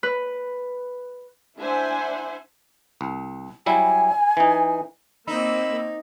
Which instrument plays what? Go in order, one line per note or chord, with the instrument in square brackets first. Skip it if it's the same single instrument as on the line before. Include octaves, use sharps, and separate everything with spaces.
[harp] B4
[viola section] D4 E4 C5 E5 F#5 G#5
[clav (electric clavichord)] C2
[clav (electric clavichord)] F#3 G3 E4 [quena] G#5
[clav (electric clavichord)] E3 D#4
[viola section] A#3 C4 [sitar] D#4 [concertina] B5 E6